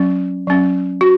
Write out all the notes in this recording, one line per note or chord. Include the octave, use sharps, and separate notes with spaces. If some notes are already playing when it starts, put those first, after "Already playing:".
Already playing: F#3 C#4
F#3 C#4
F#4